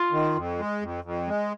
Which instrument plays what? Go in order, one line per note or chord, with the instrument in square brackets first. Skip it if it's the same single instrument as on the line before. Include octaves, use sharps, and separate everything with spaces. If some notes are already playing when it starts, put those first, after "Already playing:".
Already playing: [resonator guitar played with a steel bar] F4
[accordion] D#3
F2
G#3
F2
F2
G#3